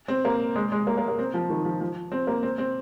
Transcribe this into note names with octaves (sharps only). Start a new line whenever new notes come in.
C4
A#3
G#3
G#3
A#3
A#3
A#3
C4
F3
D#3
F3
F3
C4
A#3
C4
C4